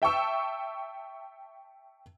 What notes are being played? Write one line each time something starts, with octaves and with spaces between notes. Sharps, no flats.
E5 G5 A5 C#6 E6